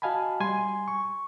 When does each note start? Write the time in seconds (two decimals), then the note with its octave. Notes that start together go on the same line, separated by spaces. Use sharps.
0.02 F#4 D#5 F5 G#5 A5 B5
0.40 G3 G#5 C6
0.88 C#6